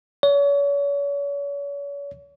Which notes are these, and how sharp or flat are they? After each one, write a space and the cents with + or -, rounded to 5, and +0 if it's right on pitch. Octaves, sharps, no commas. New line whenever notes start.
C#5 +40